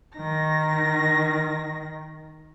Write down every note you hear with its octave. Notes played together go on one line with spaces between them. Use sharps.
D#3 A#6